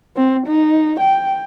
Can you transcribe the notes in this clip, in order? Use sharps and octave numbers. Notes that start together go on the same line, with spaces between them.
C4
D#4
G5